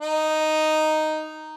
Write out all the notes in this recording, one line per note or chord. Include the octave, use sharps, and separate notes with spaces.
D#4